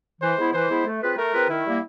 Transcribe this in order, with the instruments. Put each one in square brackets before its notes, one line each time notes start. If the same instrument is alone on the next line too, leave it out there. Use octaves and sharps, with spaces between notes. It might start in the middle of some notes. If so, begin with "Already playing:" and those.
[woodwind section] E3 [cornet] C5
[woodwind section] G#3 B3 E4
[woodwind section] E3 [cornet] C5
[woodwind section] G#3 B3 E4
A3
C4 F4 G#4 B4
[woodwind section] A3 [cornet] A#4
[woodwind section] C4 F4 G#4 B4
[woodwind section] D#3 [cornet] E4
[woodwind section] G3 A#3